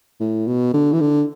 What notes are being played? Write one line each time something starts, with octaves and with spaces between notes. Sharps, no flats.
A2
B2
D3
E3
D3